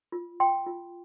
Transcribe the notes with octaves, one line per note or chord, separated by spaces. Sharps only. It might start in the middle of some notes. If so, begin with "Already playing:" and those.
F4
F4 G5 C6
F4